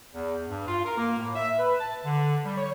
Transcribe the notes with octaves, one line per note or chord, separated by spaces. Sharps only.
E2
G2
F4
A#4
A#3
A2
E5
B4
A5
D3
G3
C#5